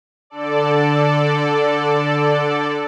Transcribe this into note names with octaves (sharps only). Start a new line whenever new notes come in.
D3 A4 D5